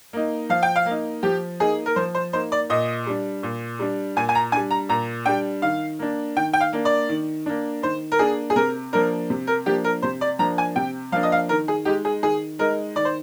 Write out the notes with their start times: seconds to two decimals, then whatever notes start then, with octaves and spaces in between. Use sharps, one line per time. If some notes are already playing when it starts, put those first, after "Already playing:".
0.13 A#3 D#4
0.49 F3 F5
0.63 G5
0.76 F5
0.86 A#3 D#4
1.23 F3 G4
1.60 A#3 D#4 G#4
1.86 A#4
1.96 F3 C5
2.15 C5
2.33 A#3 D#4 C5
2.52 D5
2.70 A#2 D#5
3.06 G3 D4
3.43 A#2
3.79 G3 D4
4.16 A#2 G#5
4.29 G#5
4.35 A#5
4.52 G3 D4 G#5
4.71 A#5
4.89 A#2 A#5
5.26 G3 D4 G5
5.62 D#3 F5
5.99 A#3 D4
6.36 D#3 G5
6.53 G5
6.60 F5
6.73 A#3 D4
6.85 D5
7.09 D#3
7.46 A#3 D4
7.83 D#3 C5
8.12 A#4
8.19 A#3 D4 G#4
8.50 G#4
8.56 C3 A#4
8.93 F3 A#3 D4 A#4
9.30 C3
9.47 A#4
9.66 F3 A#3 D4 G4
9.84 A#4
10.02 C3 C5
10.21 D5
10.39 F3 A#3 D4 A#5
10.58 G#5
10.76 C3 G5
11.12 F3 A#3 D4 F5
11.23 D#5
11.32 F5
11.49 D#3 A#4
11.68 G#4
11.85 G#3 D#4 G4
12.05 G#4
12.22 D#3 G#4
12.59 G#3 D#4 A#4
12.96 D#3 D5
13.05 C5